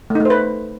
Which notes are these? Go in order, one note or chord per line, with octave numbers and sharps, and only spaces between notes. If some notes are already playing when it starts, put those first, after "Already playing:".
A3
D#4
A3
C5
B4